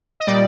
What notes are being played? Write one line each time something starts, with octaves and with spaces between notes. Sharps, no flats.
D#5
A#2 G3 D5